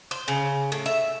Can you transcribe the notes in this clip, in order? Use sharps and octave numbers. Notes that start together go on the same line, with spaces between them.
C5
C#3
A2
E5